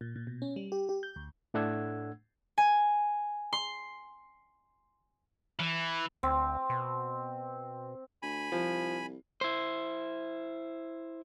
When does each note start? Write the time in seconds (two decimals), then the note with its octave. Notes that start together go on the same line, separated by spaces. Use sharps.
0.01 A#2
0.16 A#2
0.27 B2
0.42 C#4
0.56 G3
0.72 G4
0.89 G4
1.03 G6
1.16 D2
1.54 A2 A3 D4 F#5 E6 G#6
2.58 G#5
3.53 C6
5.60 E3
6.23 D2 C4
6.69 B2
8.22 D2 G#5 B5
8.52 C2 F3
9.41 E4 C5